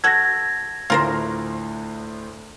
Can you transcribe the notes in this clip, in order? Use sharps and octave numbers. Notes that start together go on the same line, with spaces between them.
F#4 A4 G#6 A#6
D2 A2 F4 A#4 C5